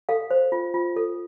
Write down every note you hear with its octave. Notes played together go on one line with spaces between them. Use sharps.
A4 F5
C5
F4
F4
A4